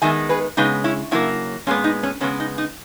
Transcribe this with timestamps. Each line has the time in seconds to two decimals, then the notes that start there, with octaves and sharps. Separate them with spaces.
0.02 D#3 G#3 B3 E5 G#5
0.29 G#4 B4
0.57 C#3 G#3 B3 D#4
0.84 C#4 E4
1.11 C#3 F#3 A#3 C#4 E4
1.67 A#2 G#3 B3 C#4
1.84 D#4
2.03 C#4
2.21 C#3 G#3 B3 C#4
2.40 D#4
2.58 D#4